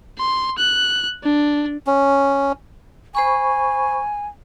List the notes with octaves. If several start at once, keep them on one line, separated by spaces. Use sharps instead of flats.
C6
F#6
D4
C#4
C5 G#5 B5 C#6